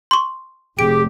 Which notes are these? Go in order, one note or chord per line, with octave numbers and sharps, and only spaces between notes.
C6 C#6
F1 G4 G#4 D7